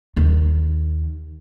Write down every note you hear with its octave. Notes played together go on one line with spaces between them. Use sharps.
D#2 D#3